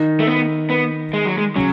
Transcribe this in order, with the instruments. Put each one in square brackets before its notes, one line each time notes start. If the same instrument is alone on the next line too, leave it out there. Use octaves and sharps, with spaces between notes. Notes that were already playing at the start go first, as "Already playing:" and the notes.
Already playing: [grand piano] D#3 D#4
[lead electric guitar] A3
B3
B3
G#3
F#3
G#3
[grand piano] C#3 C#4 [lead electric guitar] F#3